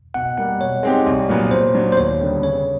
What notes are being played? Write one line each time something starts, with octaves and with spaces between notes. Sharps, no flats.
B2 F#5
G3 A#3 F#5
B2 C#5
G#3 C4 D#4 G4
C2
A#2 F#3 B3
A#2 C5
F#3 B3 D4
C5
D#2 C#5
D3 G3 B3 D4
C#3 C#5